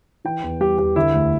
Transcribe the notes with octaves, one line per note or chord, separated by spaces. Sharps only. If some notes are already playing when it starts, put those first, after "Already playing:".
E3 G5
E2
G3 G4
E2 G4
D3 E4
D2